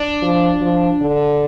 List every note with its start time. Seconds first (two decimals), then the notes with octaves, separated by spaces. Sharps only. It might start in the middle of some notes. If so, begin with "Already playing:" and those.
Already playing: D4
0.22 F3
0.61 F3
1.01 D3